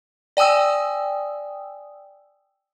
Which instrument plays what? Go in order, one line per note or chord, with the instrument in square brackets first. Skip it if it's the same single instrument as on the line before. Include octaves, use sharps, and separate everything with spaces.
[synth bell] D5 G5 G#5 D#6 E6